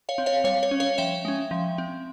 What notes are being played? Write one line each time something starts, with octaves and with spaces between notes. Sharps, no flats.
C#5 F5
C4
C#5 F5
G3 C#5 F5
C#5
C#4
C#5 F5
F3 E5 G5
G#3 C#4
F3
C4